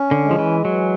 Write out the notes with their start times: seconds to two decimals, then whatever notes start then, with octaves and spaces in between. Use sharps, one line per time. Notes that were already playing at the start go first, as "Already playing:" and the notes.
Already playing: C#4
0.11 D3
0.24 G#3
0.31 F3
0.38 E3
0.65 E3 F#3